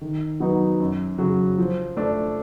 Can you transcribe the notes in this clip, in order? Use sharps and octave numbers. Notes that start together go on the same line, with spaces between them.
D#3
F#3 B3 D#4
F#2
C#3 F#3
F3
A3 D4